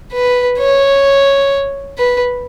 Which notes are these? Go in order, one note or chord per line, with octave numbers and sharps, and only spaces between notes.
B4
C#5
B4